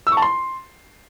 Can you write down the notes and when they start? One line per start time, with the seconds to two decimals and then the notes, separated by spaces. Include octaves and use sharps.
0.07 E6
0.12 C#6
0.17 A5
0.22 C6